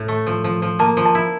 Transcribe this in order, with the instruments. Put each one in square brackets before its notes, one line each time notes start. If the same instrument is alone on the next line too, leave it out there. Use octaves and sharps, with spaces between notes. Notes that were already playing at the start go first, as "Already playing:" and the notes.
Already playing: [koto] A2
A3
F3
F3
F3
[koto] A#3 [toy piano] A5
[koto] F3
[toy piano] A5
[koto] E4